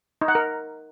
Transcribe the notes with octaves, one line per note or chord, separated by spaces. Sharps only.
D#4
F#5
A#4